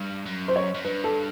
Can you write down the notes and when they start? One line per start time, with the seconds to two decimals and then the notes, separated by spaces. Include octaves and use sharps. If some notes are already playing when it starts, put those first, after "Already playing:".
Already playing: G2
0.26 F#2
0.48 C5
0.56 C#5
0.74 F#2
0.84 G2 B4
1.04 A4